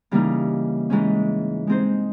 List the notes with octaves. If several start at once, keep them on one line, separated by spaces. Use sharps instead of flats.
C#3 E3 G3 A#3 D#4
G#2 E3 G#3 C#4
G#3 C4 D#4 G#4 C5